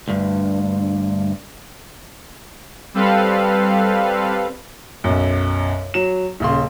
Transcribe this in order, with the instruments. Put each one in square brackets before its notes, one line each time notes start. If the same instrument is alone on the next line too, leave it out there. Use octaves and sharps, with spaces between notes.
[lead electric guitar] D2 G2
[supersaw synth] G3 C4 A4 B4 F5
[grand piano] B1 F#2
F#3 E7
D#1 C#3 C6